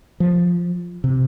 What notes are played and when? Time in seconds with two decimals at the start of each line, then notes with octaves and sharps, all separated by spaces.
0.20 F3
1.04 C3